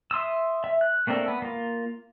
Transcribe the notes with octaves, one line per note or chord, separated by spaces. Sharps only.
E5 C6 D#6 E6
E5
F#6
A3 A#3 C4 D4 A4
B3
A#3 F4